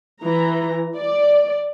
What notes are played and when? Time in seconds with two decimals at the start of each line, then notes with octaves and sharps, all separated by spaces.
0.22 E3 A#5
0.96 D5